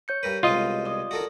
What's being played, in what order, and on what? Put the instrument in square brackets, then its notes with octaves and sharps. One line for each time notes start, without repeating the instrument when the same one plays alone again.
[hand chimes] C#5 G6 C#7
[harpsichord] G2 A#4 B4
[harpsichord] C2 B2 G#3 [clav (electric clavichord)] F4 D#5
[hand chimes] D5 D#6
[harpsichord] F#4 A4 A#4